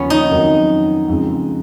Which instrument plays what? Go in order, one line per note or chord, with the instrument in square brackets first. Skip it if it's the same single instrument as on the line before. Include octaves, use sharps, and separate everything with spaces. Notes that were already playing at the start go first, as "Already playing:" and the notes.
Already playing: [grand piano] D#2 C#3 F3 [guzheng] B3 C#4
[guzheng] D#4
[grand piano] F2 D#3 F#3
F2 C#3 G#3